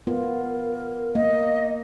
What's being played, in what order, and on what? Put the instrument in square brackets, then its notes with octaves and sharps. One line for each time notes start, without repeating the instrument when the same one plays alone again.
[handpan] B3 F4 [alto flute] A#4
[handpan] A#3 [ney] D#5